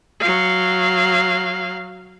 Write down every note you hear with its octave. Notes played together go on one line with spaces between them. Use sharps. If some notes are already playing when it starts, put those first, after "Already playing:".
F#3 F5